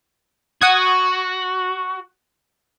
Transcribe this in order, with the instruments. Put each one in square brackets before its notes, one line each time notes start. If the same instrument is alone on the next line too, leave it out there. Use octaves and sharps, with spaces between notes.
[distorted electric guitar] F#4 [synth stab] F#5 D#6 G#6